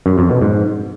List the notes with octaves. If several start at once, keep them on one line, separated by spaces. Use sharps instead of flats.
F#2
F2
B2
G#2